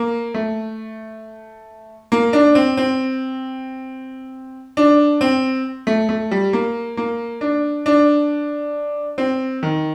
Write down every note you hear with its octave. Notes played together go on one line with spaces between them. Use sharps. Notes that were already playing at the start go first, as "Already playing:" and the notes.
Already playing: A#3
A3
A#3
D4
C4
C4
D4
C4
A3
A3
G3
A#3
A#3
D4
D4
C4
D#3